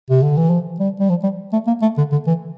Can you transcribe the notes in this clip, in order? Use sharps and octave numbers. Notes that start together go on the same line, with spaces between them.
C3
D3
E3
F3
G3
G3
F3
G3
A3
A#3
A3
D3
D3
E3